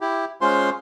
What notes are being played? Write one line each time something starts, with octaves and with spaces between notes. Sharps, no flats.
E4 G4
G#3 C#4 F4 C5 C6